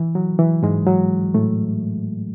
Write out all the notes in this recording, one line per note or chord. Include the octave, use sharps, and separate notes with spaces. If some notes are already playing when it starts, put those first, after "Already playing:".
Already playing: E3
F#3
E3
G#2 G#3
F#3
A2 A3